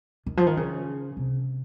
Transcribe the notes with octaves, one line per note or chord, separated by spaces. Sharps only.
D#3
F3
D#3
C#3
C3